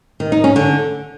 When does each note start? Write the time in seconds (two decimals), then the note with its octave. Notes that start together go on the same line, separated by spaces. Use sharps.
0.20 D#3
0.32 D#4
0.44 C#4
0.56 D3